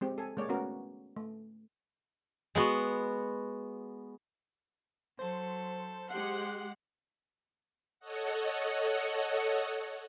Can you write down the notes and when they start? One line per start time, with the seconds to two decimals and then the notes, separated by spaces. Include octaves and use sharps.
0.01 G#3 C4 G4
0.18 A4 G#5
0.37 G#3 A#3 C#5 D5
0.49 A3 B3 C#4 F#4 A#4
1.17 A3
2.55 G#3 B3 F#4
5.19 F#3 A4 C5
6.10 G#3 G4 F#5 C6
7.99 A4 C#5 D#5 F#5